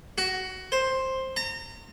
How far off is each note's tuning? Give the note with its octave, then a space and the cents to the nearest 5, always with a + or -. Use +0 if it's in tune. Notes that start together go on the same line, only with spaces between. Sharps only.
F#4 +15
C5 +10
A#5 -35